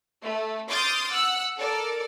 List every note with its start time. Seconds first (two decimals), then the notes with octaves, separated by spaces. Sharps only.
0.22 A3
0.69 C6 D6 D#6 F6 G6 A6
1.11 F#5 E6 F#6
1.58 A4 A#4 D5